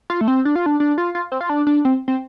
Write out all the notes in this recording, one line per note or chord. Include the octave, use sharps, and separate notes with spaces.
F4
A3
C4
D4
F4
D4
D4
F4
F4
C4
F4
D4
D4
C4
C4